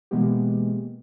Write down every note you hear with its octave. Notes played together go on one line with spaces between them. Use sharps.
B2 E3 G#3 A#3 B3 G4